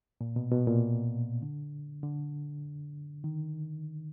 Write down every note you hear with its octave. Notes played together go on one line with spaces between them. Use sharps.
A#2
B2
B2
A#2
D3
D3
D#3